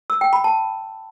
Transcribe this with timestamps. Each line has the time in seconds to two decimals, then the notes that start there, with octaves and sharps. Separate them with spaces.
0.10 E6
0.21 G5
0.33 B5
0.44 A5